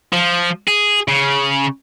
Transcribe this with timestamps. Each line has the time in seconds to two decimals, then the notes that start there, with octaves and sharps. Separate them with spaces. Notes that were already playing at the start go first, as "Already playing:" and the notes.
0.13 F3
0.68 G#4
1.08 C#3